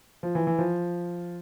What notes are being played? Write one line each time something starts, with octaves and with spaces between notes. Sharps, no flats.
F3
E3
E3
F3